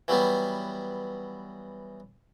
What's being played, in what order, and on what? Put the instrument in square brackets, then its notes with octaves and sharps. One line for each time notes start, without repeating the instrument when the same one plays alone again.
[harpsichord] E3 F#3 G3 B3